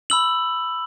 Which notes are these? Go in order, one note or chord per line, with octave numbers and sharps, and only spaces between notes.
B5 E6 F#7